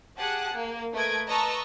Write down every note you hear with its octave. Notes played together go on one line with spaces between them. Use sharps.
G4 G#4 F#5 A5 F#6
A#3
A3 A#4 B4 D#5 G#6 D7
B4 D#5 A5 A#5 C#6 E6